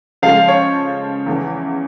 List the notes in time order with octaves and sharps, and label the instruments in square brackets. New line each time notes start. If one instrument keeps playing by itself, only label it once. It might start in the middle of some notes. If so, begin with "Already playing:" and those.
[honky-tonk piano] C#3 F3 G#3 [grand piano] F5
[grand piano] C#5
[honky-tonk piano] E2 C#3 E3